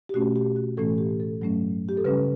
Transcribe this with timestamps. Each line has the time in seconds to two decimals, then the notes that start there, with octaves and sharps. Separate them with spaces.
0.09 G4
0.14 B2 A3 C#4 F#4
0.36 G4
0.56 F#4
0.77 A2 E3 A3 C#4 A4
0.98 G4
1.20 A4
1.41 G2 F#3 A3 C#4
1.89 G4
1.97 A4
2.04 C#3 G3 C#4 B4